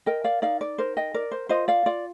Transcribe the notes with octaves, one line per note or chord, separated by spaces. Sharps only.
A#4 D#5 G5
D5 F5
D#4 D5 F5
D5
A#4 C5
D#5 G5
A#4 D5
C5
F4 C5 D#5
D5 F5
F4 D5